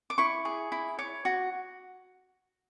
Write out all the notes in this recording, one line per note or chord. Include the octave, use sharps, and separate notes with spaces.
D6
E4 C#6
G#4
E4
C#5 D6
F#4